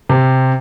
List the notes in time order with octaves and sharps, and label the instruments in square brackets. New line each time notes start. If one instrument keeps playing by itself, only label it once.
[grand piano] C3